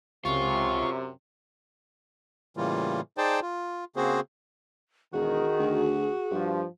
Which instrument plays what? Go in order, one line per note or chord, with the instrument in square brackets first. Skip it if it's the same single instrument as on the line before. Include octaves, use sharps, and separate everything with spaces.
[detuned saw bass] C#2 [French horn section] F#2 C3 [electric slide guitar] F4 [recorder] C#6
[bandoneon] A2 C#3 E3 G3 A#3 F4
D#4 G#4 C5 D5 G5 A5
F4
C#3 A#3 C4 F#4 G#4 C5
[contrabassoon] E1 [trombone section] D#3 [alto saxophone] F#4 [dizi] G#4
[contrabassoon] D2
[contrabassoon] G2 [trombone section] F3